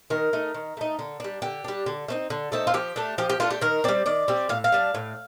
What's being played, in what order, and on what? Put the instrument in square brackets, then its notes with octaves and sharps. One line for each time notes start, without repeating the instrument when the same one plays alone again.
[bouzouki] D#3 A#4
A3 D#4
D#3
A3 D#4
D3
G3 D4
D3 G4
G3 D4
D3
A3 C4 D#4
D3
A3 C4 D#4 A4
F4
F3 G4
A3 D4
F3 G4
G4
A3 D4 F4
G4
D#3 A#4
G3 C4 D5
D#3 D5
G3 C4
A2 F5
F5
G3 D4
A2